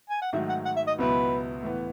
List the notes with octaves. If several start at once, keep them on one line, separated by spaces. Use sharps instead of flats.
G#5
F#5
G#2 D#3 F#3 A3 E5
F#5
F#5
E5
D#5
C#2 B2 F#3 B3 E4 B4
A2 E3 B3